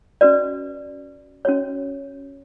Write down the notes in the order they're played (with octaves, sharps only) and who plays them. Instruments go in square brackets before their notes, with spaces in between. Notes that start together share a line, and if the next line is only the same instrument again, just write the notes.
[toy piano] C#4 F#4 B4 D5
C#4 F#4 C#5